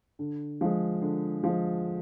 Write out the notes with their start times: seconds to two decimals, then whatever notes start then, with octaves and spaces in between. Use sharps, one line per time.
0.19 D3
0.61 F3 G#3
1.02 D3
1.44 F3 G#3